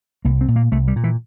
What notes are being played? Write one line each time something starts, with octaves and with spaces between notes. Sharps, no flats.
C2 A#3
C4
A#2
A#3
C2 A3
G3
A#2
E3